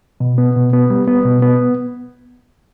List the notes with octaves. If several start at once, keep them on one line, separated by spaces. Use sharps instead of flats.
B2
B3
B2
B3
G3
B3
B2
B3